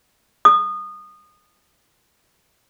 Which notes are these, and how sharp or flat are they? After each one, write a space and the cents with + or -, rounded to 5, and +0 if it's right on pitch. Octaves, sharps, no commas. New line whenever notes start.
D#6 -25